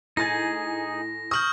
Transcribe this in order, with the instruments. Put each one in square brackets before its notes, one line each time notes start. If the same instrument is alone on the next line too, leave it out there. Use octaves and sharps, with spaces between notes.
[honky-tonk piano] A2 G#5 A6 [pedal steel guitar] D#4 G#4 [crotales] A#6
[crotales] C#6 F6 G6 [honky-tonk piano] D#6 F#7